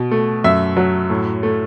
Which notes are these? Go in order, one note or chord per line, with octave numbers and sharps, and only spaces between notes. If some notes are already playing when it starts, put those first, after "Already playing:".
Already playing: B2
A3
F#2 E5
F#3
A2
A3